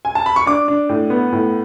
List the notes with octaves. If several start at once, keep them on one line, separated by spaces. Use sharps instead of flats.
G#5
A5
B5
C#6
D4 D6
D4
A2
B3
A2